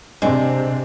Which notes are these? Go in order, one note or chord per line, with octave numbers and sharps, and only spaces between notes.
C3 G#3 C4 D4